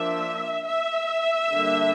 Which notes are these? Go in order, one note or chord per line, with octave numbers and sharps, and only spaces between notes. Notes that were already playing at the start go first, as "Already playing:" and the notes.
Already playing: F3 A#3 D4 E5
E5
D3 G3 A#3 D4